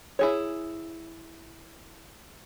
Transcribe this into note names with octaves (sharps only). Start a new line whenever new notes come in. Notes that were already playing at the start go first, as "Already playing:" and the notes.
E4 G#4 C#5